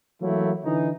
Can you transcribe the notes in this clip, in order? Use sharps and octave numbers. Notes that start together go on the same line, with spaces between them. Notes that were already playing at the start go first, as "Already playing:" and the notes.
E3 F#3 A3 A#3 E4
D3 E3 D#4